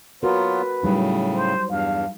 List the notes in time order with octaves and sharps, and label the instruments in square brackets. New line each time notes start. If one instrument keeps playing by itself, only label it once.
[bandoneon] F#3 B3 F4 [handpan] F#4 A#4 [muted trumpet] B4
[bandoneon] A2 C#3 [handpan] F#3 G3 D#4
[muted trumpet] C5
[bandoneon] E2 G2 [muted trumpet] F5